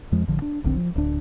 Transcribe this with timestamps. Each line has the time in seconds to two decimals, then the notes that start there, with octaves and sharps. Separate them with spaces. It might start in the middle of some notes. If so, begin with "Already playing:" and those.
0.12 F2 F3 G#3
0.28 A1 D3 F3
0.42 D4
0.64 D#1 A#1 D3 C4
0.77 F3
0.95 D1 D2 D4